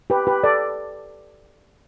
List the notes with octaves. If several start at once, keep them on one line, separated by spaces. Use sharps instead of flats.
G4 B4
G4 B4
A4 D5